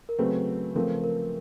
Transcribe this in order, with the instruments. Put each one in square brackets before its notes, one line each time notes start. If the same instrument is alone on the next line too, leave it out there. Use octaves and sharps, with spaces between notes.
[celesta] A#4
[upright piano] C#3 F#3 A3 C4 [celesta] B4
[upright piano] C#3 F3 A3 C4 [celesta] A#4
[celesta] A#4